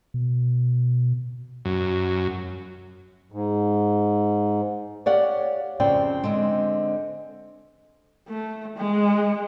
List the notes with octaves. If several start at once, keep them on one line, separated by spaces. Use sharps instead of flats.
B2
F#2
G#2
G4 C#5 D5 F5 F#5
F2 C#3 C4 C5 D5 G5
D3 G#3 C4
A3
G#3